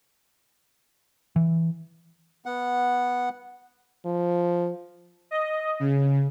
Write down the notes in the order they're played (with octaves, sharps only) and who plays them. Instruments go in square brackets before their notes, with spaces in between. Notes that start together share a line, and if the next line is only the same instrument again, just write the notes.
[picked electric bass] E3
[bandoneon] B3 F#5
[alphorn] F3
[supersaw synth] D#5
C#3